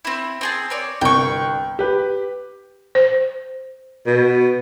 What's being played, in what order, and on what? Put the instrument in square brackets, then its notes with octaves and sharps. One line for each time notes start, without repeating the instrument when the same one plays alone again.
[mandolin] C4 E4
C4 G#4 A5
C4 C#5 D5
[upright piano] G1 C2 [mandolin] G5 C#6
[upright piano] G4 B4
[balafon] C5
[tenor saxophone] B2